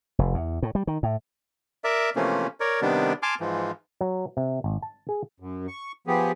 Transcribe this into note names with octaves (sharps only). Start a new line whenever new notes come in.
F1
E2
A2
G3
D#3
A2
A#4 D5 E5
C3 E3 F3 A3 A#3 C#4
A#4 C#5 D5
C3 D#3 G3 B3 D4
G#5 A5 C6 D6 F6
G#2 E3 F3
F#3
C3
G#1
A5
G#4
F#2
C#6
F3 B3 G4 G#4